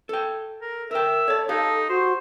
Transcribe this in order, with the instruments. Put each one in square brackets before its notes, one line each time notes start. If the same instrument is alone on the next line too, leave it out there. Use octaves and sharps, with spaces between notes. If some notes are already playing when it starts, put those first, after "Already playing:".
[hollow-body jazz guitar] A4 G5
[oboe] A#4
[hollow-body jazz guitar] A#4 G5 [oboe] E5
[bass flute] A4 [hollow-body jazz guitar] C#5 D5
[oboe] D#4 [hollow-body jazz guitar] G4 F5 [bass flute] A4
[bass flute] F#4 [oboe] C5